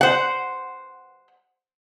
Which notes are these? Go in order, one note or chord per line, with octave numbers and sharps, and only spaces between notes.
C5 F#5